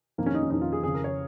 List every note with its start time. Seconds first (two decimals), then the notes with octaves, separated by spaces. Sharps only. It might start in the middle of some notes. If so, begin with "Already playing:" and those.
0.18 F2 D#3 A#3
0.26 C#4
0.34 D#4
0.43 C#4
0.50 F2 D#3 D#4
0.62 F4
0.72 G#4
0.83 F2 C#3 G#4
0.94 A#4
1.04 C#5